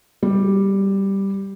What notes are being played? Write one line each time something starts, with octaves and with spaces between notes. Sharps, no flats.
G3